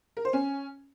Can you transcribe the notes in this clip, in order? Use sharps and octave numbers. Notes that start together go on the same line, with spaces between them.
A#4
C5
C#4